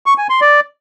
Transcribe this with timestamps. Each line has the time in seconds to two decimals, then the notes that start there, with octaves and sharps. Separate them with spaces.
0.06 C#6
0.18 G#5
0.30 C6
0.41 D5